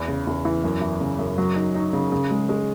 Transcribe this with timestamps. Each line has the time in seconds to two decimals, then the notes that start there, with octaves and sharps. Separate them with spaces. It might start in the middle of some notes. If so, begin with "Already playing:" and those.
Already playing: E2
0.08 C#3
0.27 E2
0.45 E3
0.64 F#2
0.81 E3
1.01 C#3
1.19 F#2
1.38 F#3
1.56 D#4
1.75 D#4
1.93 C#3
2.12 C#3
2.31 G#3
2.49 G#3